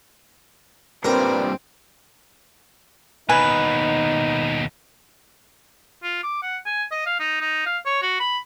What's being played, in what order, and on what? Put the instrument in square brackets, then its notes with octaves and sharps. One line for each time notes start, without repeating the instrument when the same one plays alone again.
[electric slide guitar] G2 A#2 G3 [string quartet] C4 [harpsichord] A#4 [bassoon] B4
[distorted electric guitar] D#2 B2 [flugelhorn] D#4 [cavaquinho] B4 [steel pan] G#5
[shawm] F4
D6
F#5
G#5
D#5
F5
D#4
D#4
F5
C#5
F#4
B5